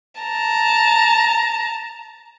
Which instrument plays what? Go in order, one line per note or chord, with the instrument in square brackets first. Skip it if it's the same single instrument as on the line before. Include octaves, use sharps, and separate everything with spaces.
[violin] A5 A#5